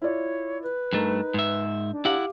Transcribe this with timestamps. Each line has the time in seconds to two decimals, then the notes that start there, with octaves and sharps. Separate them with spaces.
0.02 E4 F4 C#5 D5
0.63 B4
0.93 G2 A3 D#4 A#4
1.34 G#2 E5
1.91 D4
2.05 E4 G4 F5 F#5 D6